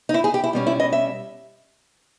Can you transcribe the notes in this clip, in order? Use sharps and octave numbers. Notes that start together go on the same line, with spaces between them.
D#4
E4
G#4
G4
E4
B2 G3 C#4
E4
D#5
E5